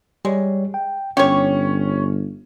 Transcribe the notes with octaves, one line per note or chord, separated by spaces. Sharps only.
G3 G#3 C#5
G5
G1 C#4 G4 C#5 C#6